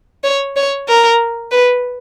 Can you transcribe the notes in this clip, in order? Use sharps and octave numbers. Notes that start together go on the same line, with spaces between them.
C#5
C#5
A#4
B4